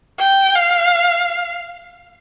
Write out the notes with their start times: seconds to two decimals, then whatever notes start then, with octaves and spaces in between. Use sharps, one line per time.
0.20 G5
0.55 F5